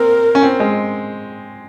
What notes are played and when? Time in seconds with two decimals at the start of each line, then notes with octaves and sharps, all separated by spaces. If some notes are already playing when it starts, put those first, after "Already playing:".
Already playing: A#3 C4 A#4
0.35 C#4
0.43 C4
0.60 G#3